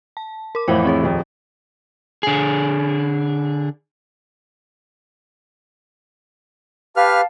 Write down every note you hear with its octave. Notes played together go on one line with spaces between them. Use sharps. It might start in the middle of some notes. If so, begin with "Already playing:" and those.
A5
A#4 D6
F2 A2 E3 C5 F5 F#5
C4 G#4 C#5
D#1 F2
D3 G#4
G4 B4 F5 A5 F6